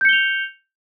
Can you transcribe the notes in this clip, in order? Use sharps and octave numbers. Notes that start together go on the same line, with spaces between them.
G6 C#7 F7 G7